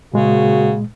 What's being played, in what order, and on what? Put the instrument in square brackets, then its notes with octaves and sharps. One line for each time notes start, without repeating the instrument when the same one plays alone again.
[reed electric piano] A#2 G#3 [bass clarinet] C#3 [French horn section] A#3 C4 F#4